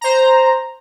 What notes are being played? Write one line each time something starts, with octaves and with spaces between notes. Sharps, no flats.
C5 A#5